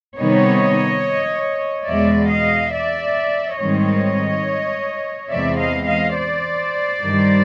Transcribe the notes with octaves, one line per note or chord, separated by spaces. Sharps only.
C3 D#3 G3 B3 D#4 C#5 D#5
E2 B2 G#3 D5 E5
D#5 F5
D5 E5
G#2 D#3 G3 C4 C#5 D#5
E2 C3 E3 G#3 C4 D5 E5
D#5 F5
D#5 F5
C5 D5
G2 D#3 G3